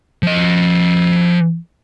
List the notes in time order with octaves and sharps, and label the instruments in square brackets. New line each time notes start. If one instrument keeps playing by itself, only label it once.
[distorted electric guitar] F3 D#5